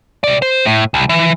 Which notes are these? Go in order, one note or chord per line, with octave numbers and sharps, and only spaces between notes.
C3 D5
C5
A2
C2
E3